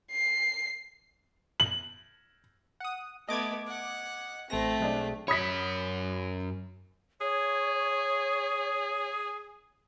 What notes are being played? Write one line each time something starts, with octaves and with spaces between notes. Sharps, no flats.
C7
F#7
F#5 D#6
A3 B3 D#5 D6 G#6
F#5
A1 A3 C4 A#6
B1 G#3 D4
F#2 C#5 B5 D#6 B6
G#4 C#5